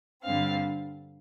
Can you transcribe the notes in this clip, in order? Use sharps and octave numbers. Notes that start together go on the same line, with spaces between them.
G2 D3 G3 C4 F5